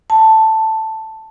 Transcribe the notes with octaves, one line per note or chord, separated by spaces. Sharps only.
A5